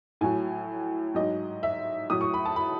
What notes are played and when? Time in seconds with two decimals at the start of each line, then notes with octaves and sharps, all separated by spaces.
0.21 A2 F#3 G#5
1.15 G#2 F#3 D#5
1.63 E5
2.10 A2 F#3 D#6
2.21 C#6
2.34 B5
2.45 A5
2.56 B5